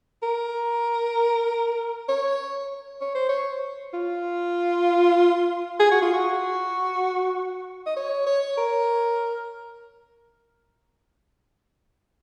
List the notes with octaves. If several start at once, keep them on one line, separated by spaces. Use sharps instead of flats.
A#4
C#5
C#5
C5
C#5
F4
G#4
F#4
F4
F#4
D#5
C#5
C#5
A#4